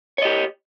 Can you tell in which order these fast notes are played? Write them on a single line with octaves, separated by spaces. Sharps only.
C#5 D#5 G4